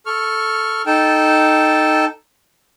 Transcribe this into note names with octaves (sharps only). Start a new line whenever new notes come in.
A4 C#6 F6
D#4 A4 G5 A5